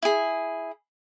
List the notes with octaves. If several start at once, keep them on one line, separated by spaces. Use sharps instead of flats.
E4 G#4